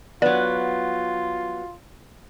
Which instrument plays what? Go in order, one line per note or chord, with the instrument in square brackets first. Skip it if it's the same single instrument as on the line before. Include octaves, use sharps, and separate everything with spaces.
[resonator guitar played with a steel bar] F#3 B3 [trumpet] F4 [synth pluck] D5